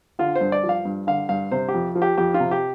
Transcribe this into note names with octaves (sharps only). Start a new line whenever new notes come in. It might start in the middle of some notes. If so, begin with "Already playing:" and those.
D3 F4
C5
G2
D5
F3
F5
G2
D3 F5
G2 F5
C3 C5
G4
F2
F3
G4
F2 G4
F4
C3
G4